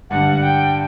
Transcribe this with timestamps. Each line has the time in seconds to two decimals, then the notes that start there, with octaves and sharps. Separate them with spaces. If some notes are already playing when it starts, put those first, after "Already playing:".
0.10 G2 D3 G3 F#5
0.43 G5